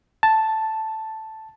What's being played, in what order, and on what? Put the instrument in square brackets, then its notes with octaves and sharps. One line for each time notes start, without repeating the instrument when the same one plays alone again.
[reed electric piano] A5